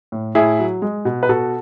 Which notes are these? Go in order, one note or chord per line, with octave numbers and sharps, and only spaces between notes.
A2
A2 E4 G#4
F#3
G#3
B2
B4
B2 F#4 A4